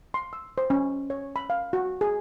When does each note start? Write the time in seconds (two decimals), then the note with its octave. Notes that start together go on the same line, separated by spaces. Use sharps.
0.14 C6
0.33 E6
0.58 C5
0.70 C#4
1.10 C#5
1.36 B5
1.50 F5
1.73 F#4
2.01 G#4